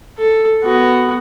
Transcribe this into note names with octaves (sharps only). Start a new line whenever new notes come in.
A4
B3 F#4